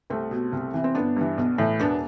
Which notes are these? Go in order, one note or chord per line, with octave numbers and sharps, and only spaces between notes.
C2 A3 C4
B2
C2
C3 E3
C4
G1 B3 D4
G2 E3
B1
A2 E3
E1 B3 D4